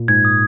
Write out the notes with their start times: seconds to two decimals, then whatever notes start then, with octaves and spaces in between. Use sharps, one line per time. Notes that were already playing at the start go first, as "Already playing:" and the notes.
Already playing: A#2
0.08 G#2 G#6
0.25 D#6